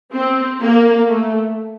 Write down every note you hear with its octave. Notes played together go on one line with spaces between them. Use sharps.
C4
A#3
A3